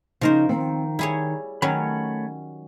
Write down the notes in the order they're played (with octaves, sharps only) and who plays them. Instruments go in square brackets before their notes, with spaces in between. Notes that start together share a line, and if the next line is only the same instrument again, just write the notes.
[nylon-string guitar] C#3 D#4 [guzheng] F3 A#4 C5
[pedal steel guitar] D#3 [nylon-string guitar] C4
[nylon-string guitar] G3 [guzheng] E4 G#4 C#5
[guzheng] D#3 F#3 C#4 [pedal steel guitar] A3 C#5 B5